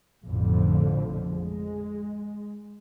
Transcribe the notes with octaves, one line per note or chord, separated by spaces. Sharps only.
A1 F2 B2 D3 F3
G#3